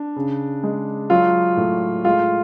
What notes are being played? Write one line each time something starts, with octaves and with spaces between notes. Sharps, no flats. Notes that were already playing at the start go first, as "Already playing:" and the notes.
Already playing: D4
C#3
G#3
F#3 F4
A2
G#3 F4